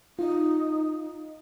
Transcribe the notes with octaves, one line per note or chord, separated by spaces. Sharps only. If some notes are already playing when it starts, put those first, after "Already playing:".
D#4 F4 D#5